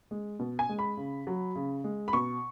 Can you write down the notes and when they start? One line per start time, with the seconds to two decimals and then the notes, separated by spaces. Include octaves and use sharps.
0.11 G#3
0.39 B2
0.59 G#5
0.69 G#3
0.79 B5
0.97 C#3
1.27 F#3
1.56 C#3
1.84 G#3
2.08 B5
2.13 B2 C#6